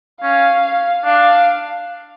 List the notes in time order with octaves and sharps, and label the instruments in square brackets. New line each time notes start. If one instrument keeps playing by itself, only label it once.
[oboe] C#4 [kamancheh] F5
[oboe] D4 [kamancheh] F5